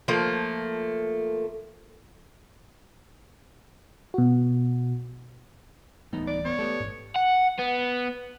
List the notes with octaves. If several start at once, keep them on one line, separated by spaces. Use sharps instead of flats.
F3 A3 A#3
B2 F#4
D1 A2 E3 G3 B3 D#4
D5
C#2 B3 C#5
A3 B3 G4 A4
A1 G#2
F#5
B3